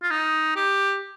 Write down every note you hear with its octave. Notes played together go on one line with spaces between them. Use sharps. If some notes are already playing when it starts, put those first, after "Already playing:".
F4
D#4
G4